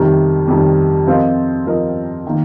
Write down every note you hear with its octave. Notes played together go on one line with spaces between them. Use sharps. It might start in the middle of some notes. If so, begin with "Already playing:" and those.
Already playing: F2 C3 D#3 G3
F2 C3 D#3 G3
F3 C4 F4 A#4 D#5
F3 C4 F4 A#4 D#5
D#3 A#3